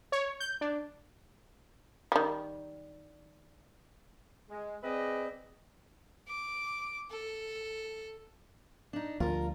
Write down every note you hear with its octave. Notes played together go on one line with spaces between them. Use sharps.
C#5
G6
D4
D#3 G3
G#3
C4 G#4 B4 D5 D#5
D6
A4
D4 D#4
D2 F3 G3 F4 A#4